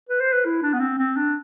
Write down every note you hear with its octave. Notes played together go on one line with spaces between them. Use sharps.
B4
C5
B4
E4
D4
B3
C4
C4
D4